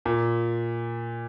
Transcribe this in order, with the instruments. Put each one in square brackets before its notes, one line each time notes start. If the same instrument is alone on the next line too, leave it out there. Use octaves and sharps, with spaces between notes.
[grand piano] A#2